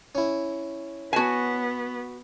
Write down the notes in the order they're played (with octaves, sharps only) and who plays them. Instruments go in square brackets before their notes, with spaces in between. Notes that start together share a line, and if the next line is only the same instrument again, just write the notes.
[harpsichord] C#4 E4
[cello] B3 [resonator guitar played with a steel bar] F#4 G#5